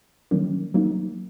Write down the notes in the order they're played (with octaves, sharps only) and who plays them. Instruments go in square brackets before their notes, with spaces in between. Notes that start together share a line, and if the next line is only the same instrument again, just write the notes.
[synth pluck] D#3 F#3 A#3 C#4
F#3 A#3 D#4